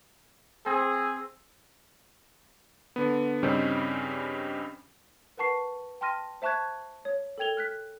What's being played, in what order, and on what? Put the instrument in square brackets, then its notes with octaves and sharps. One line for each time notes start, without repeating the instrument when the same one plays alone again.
[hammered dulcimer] C4 [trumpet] G#4
[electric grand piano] D3 B3
G2 C#3 G3 C4 C#4 D#4
[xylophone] A#4 B4 F#5 A5 C#6 C7
G5 A5 C6 F6 A#6 D#7
C5 E5 A5 C#6 F#6 G#6
C#5
A4 A#4 G5 G#6 F7 G7
F6 F#6 B6